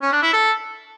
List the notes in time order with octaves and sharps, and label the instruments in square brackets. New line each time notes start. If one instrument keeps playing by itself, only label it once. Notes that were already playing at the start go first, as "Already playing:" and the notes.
[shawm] C#4
D4
E4
A4